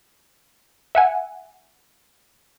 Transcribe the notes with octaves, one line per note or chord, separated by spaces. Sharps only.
E5 F#5 G#5